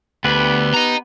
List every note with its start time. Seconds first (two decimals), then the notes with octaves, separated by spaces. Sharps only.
0.24 D2 B3 G4 B4
0.74 D#5 A#5